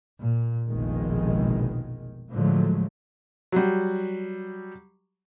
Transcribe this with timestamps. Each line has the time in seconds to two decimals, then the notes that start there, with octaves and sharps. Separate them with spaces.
0.20 A#2
0.67 F1 A#1 B2 D#3 G#3
2.32 A2 D3 F3 F#3 G#3 A3
3.52 F#3 G3